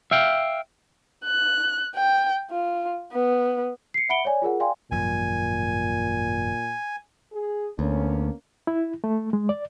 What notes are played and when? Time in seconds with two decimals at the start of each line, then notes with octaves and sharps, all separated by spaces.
0.11 E5 F5 G5
1.24 F#6
1.96 G5
2.51 F4
3.12 B3
3.94 C7 C#7
4.09 E5 F#5 B5 C#7 D7 G7
4.25 C#5 D5 G#5
4.42 F4 G#4 A#4 F#5
4.60 D5 F5 G5 G#5 C6
4.92 G#1 F#2 A#2 F3 G#5
7.33 G#4
7.79 D2 A#3 B3 C#4
8.67 E4
9.04 A3
9.33 G#3
9.49 D5